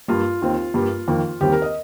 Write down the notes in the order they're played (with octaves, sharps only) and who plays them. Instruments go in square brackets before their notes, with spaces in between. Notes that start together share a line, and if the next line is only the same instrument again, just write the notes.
[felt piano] G2 G3 A#3 F4
D#2 D#3 C4
G2 G3 A#3
F2 D#3 A#3
D#2 D#3 G3 C4 G4
A#4
D#5